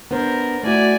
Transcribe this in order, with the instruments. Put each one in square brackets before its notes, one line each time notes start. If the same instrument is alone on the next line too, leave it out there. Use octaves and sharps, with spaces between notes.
[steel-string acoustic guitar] B3 D4 C5 [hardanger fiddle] A#4
[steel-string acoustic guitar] A3 E4 F#4 [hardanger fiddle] D5 G#5